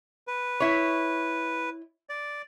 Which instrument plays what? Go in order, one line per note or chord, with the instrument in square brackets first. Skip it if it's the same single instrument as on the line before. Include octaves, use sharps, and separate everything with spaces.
[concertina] B4
[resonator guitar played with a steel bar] E4 C#5
[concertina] D5